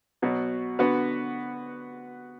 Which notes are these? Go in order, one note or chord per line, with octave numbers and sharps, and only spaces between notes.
B2 F#3 B3 F#4
D3 B3 F#4 B4